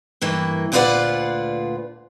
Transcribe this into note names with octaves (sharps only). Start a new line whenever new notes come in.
G2 E3 A#3
D2 A#2 F4 B4 D5 F#5